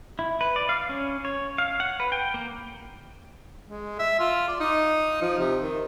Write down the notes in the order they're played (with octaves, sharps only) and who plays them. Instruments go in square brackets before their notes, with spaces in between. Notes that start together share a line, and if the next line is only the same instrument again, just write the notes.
[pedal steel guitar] E4
B4
D5
F5
C#4
C#5
F5
F#5
B4
G5
A#3
[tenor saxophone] G#3
E5
F4
D5
D#4
F3
C3
D#3